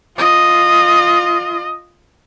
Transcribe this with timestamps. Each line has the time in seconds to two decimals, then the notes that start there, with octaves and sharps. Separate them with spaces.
0.18 F4 D#5